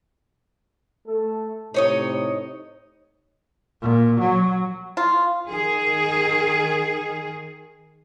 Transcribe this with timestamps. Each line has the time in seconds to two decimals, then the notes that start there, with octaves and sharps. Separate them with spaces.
1.08 A3 A4
1.74 A2 C3 D#4 C#5 D#5
3.82 A#2
4.20 F#3
4.97 F4
5.47 D#3 G#4